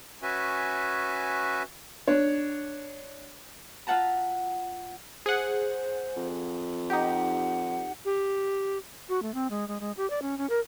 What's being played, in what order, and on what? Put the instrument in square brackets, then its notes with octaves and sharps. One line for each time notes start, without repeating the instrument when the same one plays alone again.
[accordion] C#4 F#4 B4 E5 G#5
[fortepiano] D4 C#5
[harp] F4 E5 F#5 A5 A#5
[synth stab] G#4 F#5 [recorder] C5
[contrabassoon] F2
[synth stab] D#4 G4 [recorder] F#5
[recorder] G4
F#4
A3
C4
G#3
G#3
G#3
G4
D5
C#4
C#4
A#4